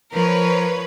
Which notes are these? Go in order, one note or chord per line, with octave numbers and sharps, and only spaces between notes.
F3 A#4 B4 C#5